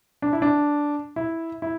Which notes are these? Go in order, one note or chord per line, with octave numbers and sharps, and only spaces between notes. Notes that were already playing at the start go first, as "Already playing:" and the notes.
D4
E4
D4
E4
E4